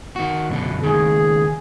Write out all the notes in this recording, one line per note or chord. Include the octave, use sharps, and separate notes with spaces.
D#3 F#4
F#2 B2 D3
C#2 D#3 G#4